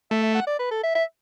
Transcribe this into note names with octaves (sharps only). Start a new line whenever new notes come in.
A3 E5
E5
F#5
D5
B4
A4
E5
E5